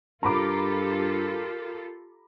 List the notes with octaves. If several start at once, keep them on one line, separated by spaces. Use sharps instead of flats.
G2 F4 G4 A4 A#4 A#5 B5 D6